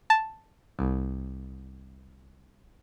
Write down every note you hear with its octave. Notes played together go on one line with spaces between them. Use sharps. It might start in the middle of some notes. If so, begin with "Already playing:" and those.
A5
C2